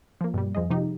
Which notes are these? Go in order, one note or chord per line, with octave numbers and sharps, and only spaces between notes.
F3 A#3
G2 B2 G3
F2 F3 G#4 D#5
C3 F3 D#4 G4